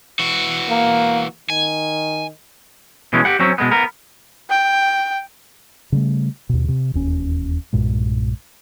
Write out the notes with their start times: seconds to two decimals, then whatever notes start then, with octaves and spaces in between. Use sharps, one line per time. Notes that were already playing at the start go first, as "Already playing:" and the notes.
0.19 E3 F#4
0.69 A#3
1.50 D#3 G#5
3.13 B2 E3 G#3 C#4
3.25 G4 F#5
3.39 F#3 C4 C#4
3.58 B2 G#3 B3
3.71 B3 A#4
4.50 G5
5.92 C#3 G3 A3
6.49 D#2 B2
6.68 C3
6.94 E1 D#2 C#4
7.73 B1 G2 A#2 G#3